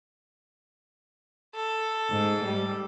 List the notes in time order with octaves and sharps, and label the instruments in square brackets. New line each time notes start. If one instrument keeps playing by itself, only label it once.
[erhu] A4
[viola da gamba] G#2
G3